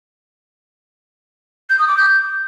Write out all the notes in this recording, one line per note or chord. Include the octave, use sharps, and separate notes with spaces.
G6
D#6
D6
G6